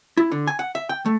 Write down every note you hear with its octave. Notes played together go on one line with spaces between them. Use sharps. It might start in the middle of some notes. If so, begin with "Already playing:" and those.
E4
D3
G#5
F#5
E5
G5
A3